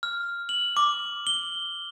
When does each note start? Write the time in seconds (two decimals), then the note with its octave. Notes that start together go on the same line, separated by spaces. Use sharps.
0.03 F6
0.49 F#7
0.77 D6
1.27 G7